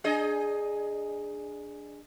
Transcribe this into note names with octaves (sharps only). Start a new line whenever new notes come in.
D4 G#4 D#5